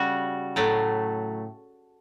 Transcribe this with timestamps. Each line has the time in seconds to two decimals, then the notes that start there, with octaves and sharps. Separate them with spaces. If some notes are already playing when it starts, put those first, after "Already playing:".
Already playing: C#3 G3 F#4
0.56 A2 F#3 A3